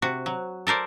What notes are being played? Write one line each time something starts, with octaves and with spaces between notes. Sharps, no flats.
C3 F#4
F#3
A4 A#4 C5 D5